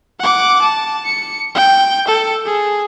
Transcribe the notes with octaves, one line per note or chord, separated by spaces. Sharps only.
F#5 D6
A5
C#7
G5
A4
G#4